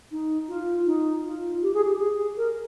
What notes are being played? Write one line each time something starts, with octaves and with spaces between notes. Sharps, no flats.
D#4
F4
D#4
F4
G4
G#4
G4
G#4
A#4